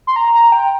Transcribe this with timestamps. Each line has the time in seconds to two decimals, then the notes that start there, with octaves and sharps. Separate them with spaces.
0.07 C6
0.16 A#5
0.35 A#5
0.52 G5